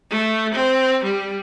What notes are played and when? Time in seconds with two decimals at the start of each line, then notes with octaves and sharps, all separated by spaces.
0.11 A3
0.55 C4
1.04 G3